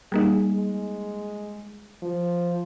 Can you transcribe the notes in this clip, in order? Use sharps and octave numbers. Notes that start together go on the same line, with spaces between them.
G3 A#3 D#4 G#4
G#3
F3